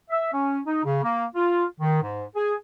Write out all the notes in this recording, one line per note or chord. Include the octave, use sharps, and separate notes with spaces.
E5
C#4
D#4
C#3
A#3
F4
D#3
G#2
G#4